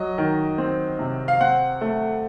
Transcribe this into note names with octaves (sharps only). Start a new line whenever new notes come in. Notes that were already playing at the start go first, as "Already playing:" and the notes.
Already playing: F#3 D#5
D#3
C4
C3
F5
C4 F#5
A3